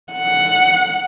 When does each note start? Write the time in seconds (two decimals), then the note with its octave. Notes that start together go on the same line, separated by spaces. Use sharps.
0.13 F#5